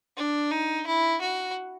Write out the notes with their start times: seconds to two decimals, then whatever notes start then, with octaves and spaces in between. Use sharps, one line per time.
0.17 D4
0.51 D#4
0.87 E4
1.22 F#4